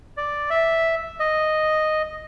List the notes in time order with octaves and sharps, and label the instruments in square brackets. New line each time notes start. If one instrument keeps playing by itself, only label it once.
[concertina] D5
E5
D#5